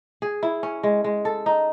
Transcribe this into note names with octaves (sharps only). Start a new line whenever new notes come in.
G#4
E4
C#4
G#3
G#3
A4
D#4